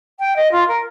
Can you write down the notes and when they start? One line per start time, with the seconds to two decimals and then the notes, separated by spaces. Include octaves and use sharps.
0.19 G5
0.36 D#5
0.52 F4
0.68 A#4